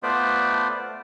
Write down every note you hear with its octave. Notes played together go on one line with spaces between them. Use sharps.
A3 B3 F4 B4 C5 D5